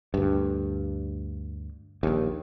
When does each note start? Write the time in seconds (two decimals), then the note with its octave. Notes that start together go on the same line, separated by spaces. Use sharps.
0.14 D2 G2
2.03 A#1 D#2